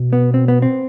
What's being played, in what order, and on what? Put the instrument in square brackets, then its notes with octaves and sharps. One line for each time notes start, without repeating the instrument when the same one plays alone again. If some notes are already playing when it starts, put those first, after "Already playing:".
Already playing: [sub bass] B2
[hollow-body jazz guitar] B3
C4
B3
C4